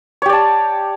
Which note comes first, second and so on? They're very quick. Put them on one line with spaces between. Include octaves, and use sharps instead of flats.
C#5 G4 D5 A5